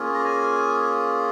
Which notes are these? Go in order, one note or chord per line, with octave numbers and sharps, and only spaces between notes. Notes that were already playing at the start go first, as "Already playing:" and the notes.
Already playing: A#3 C#4 F4 G#4
A#5
G#5